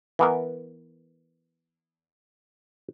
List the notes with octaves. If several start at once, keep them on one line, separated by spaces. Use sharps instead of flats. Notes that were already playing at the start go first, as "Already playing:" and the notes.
E3 B3 A#4